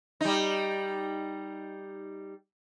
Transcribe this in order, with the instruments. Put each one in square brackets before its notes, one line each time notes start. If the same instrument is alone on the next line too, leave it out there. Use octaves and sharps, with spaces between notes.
[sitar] G3 D#4